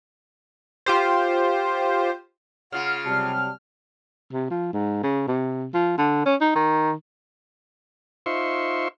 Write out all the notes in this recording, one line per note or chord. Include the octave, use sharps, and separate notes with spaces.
F4 G4 C5
C#3 F4 F#5 F6
C3 F#3 G3 A5
C3
F3
G#2
C#3
C3
F3
D3
C#4
D#4
D#3
D#4 F4 C5 E5 C6 C#6